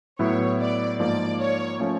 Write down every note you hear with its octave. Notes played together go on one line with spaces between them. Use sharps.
A2 F#3 B3 E4 C#5
D5
G#2 F3 A#3 D5
C#5
F3 A3 C#4